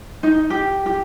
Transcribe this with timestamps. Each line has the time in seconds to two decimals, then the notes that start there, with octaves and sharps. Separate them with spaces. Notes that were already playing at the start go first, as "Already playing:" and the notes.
0.23 D#4
0.50 G4
0.86 G4